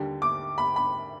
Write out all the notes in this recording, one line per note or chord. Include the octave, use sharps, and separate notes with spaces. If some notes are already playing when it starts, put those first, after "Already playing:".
Already playing: D#2 D3 G3
D6
B5
B5